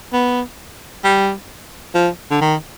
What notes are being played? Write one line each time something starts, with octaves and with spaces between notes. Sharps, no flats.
B3
G3
F3
D3
D#3